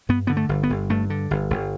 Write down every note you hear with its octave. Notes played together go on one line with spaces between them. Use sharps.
G2 B3
D3 B3
A3
G1
B3
G1
G2 A3
D3
G1
G1